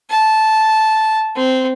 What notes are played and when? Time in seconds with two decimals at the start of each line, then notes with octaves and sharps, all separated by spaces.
0.10 A5
1.36 C4